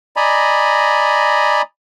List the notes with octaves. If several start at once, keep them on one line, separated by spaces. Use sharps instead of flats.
D5 D#5 G#5 A#5 B5